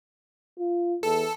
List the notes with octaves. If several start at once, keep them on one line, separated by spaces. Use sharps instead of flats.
F4
E2 A4